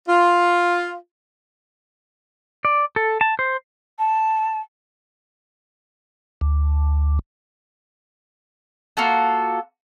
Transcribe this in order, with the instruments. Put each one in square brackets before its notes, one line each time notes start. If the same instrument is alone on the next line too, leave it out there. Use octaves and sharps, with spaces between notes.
[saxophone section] F4
[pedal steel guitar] D5
A4
A5
C5
[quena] A5
[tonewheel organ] D2
[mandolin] A#3 F4 F#4 A4